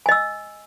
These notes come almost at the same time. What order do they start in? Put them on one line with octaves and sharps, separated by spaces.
G#5 D#5 E6